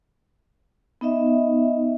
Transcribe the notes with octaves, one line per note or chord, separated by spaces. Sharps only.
B3 D#4 D#5 E5